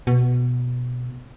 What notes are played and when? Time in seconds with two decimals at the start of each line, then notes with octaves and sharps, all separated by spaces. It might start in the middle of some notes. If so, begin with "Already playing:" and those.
0.07 B2